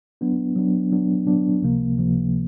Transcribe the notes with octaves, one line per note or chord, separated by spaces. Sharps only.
F#3 B3 D4
F#3 B3 D4
F#3 B3 D4
F#3 B3 D4
C#2 C3 F3 A#3
C#2 C3 F3 A#3